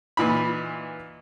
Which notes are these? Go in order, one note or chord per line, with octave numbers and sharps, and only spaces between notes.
A#2 E3 D#4 B5